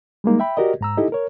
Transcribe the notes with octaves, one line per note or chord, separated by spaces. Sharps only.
G3 G#3 A#3 D#4
E5 G5 B5
F#4 G4 A#4 D5 D#5
G#2 A#5 E6
D#4 E4 G4 A4 D#5
A#4 C#5